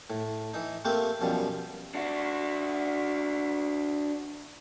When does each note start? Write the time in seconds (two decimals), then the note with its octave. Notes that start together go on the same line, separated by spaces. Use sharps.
0.10 A2
0.54 E3 D#4
0.85 A3 A#3 C4 G4 B4
1.21 F#2 B2 F3 G3
1.95 D4 F#4